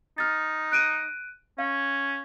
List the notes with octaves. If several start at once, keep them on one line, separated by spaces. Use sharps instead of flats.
D#4 F6 A6
F#6 D7 D#7
C#4 F5